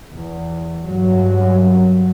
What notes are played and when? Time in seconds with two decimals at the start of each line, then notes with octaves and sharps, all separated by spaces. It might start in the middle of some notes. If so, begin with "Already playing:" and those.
0.11 E2
0.85 G2 F#3